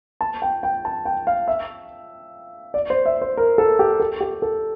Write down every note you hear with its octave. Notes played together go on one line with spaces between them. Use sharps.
A5
G5
G5
A5
G5
F5
E5
D5
C5
E5
C5
A#4
A4
G4
A4
G4
A4